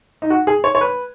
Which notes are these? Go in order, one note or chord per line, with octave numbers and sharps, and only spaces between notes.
D#4
F#4
G#4
C#5
C#5
B4